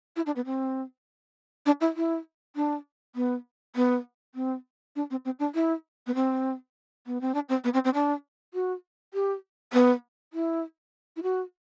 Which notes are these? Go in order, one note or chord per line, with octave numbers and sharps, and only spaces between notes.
E4
D4
B3
C4
D4
E4
E4
D4
B3
B3
C4
D4
C4
C4
D4
E4
B3
C4
B3
C4
D4
C4
B3
C4
C4
D4
F#4
G4
B3
E4
E4
F#4